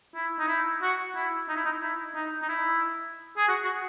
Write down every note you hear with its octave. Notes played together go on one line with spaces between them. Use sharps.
E4
D#4
E4
F#4
E4
D#4
E4
D#4
E4
D#4
D#4
E4
G#4
F#4
F#4